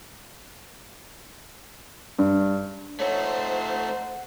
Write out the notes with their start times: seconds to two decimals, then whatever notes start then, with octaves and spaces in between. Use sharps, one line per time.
2.19 G2
3.00 A3 D#4 C5 C#5 F#5